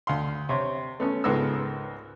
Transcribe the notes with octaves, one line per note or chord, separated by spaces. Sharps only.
D2 F5 C6
C3 C#5
A3 B3 C#4
C#2 G#2 B3 A4 A#4 E6